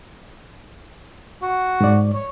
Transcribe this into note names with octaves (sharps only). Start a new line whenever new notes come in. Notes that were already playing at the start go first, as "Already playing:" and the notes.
F#4
G#2 D5
C#5